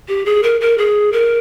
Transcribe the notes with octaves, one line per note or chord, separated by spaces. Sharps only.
G4
G#4
A#4
A#4
G#4
A#4